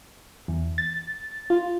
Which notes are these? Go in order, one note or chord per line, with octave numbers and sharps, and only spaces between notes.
E2
A6
F4